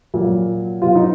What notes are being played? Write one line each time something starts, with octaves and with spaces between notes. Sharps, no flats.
A#2 F#3
B2 F#3 F4
D#4